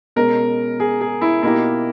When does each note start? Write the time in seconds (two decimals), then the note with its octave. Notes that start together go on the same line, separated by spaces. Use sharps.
0.16 B2 G#3 C#4 A#4
0.80 G#4
1.01 G#4
1.22 E4
1.43 B2 A#3 D#4 E4 G4 A#4